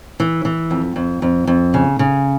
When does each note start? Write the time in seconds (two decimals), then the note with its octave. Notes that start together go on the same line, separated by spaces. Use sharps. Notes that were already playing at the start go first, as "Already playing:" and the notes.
0.20 E3
0.45 E3
0.71 F2
0.96 F2
1.22 F2
1.47 F2
1.74 C#3
1.99 C#3